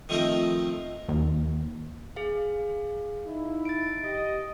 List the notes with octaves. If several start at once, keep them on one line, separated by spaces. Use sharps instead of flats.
D#3 F3 A3 C4 D#4 A#4
D#2
G#4 F5
D#4 E4
A6 D7
G4 D#5